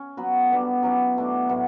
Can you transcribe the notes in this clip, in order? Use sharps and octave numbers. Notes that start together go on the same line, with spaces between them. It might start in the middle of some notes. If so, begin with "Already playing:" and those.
Already playing: C#4
F#3 B3 F#4 B4
G3 B3 D4 A4
F#3 C#4 E4 G4
B2 A3 D4
A2 F#3 B3